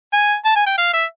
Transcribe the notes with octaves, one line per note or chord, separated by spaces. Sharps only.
G#5
A5
G#5
G5
F5
E5